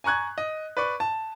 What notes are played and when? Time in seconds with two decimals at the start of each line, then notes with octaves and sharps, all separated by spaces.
0.04 G#5 A#5 C#6 F#6 G#6
0.38 D#5
0.77 B4 D5 C#6
1.00 A5